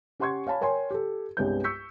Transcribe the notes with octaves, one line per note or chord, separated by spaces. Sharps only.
C#4 G4 F#5 C6 C#6 G#6
C#5 F5 G#5 A5 B5
A#4 C#5 G5 G#5 C6
G4 A4
C2 G2 G#3 B3 C#5 G6
C#6 E6 G6 B6 C#7